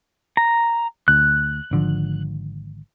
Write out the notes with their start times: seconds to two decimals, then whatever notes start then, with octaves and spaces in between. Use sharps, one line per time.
0.37 A#5
1.08 D2 F#6
1.71 G#1 D3 F3